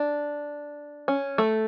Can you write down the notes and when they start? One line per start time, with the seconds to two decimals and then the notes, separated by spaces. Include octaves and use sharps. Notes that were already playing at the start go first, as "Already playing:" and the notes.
Already playing: D4
1.08 C#4
1.38 A3